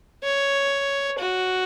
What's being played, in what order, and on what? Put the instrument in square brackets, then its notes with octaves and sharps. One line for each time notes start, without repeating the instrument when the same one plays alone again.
[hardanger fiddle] C#5
F#4